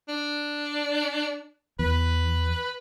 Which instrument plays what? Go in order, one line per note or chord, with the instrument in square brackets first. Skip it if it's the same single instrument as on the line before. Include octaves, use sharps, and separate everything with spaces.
[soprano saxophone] D4
[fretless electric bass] E2 [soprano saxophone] B4